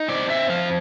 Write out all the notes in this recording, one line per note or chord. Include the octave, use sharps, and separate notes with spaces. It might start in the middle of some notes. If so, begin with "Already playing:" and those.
Already playing: D#4
C4 D5
E5
F3 F5